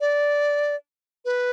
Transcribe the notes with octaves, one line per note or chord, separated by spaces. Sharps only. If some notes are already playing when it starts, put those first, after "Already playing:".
D5
B4